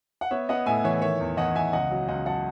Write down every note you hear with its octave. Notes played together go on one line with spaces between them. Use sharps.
F#5
B3 C#5 E5
B3 D#5 F#5
A2 E5 G#5
E3 C#5 E5
D#3 C#5 E5
E2
E2 D#5 F#5
E2 E5 G#5
C#2 D#5 F#5
F#3
C#2 D#5 F#5
F#3 F#5 A5